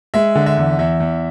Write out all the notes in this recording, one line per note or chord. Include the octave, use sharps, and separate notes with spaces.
G#3 E5
D3
E5
E2
E2 E5
E2